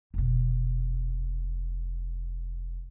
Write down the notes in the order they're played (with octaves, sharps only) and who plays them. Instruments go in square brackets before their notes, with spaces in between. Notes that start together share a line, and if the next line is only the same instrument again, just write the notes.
[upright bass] F1 B2